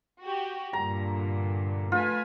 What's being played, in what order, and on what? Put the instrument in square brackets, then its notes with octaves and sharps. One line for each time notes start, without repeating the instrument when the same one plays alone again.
[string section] F#4 G4
[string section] G2 A#2 D3 [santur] A#5
[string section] A3 B4 G#5 [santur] F4